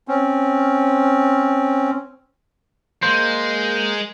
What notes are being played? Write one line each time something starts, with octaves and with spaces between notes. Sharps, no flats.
C4 C#4
G#3 A#3 C5